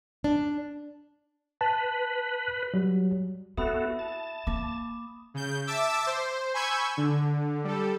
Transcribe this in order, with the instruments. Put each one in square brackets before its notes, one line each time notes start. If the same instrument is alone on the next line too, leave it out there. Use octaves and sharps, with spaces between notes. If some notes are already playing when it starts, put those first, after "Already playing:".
[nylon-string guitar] D4
[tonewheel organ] B4 [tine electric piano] A5
[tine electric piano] F#3 G3
[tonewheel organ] B3 F#4 A4 [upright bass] E4 [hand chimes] E5 [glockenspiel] B5 D#6
[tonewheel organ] A5
[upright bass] A#3 [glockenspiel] D6
[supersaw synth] C#3 G6
E5 A5 D6 E6
C5
G#5 B5 C#6 E6 G6 G#6
D3
G3 A4